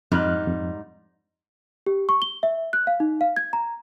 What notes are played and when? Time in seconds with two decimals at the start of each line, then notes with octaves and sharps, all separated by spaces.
0.12 F2 G#2 G3 D#4 F6 F#6
0.47 F2
1.86 G4
2.09 C#6
2.22 G7
2.43 E5
2.73 F#6
2.87 F5
3.00 D#4
3.21 F5
3.36 G#6
3.53 A#5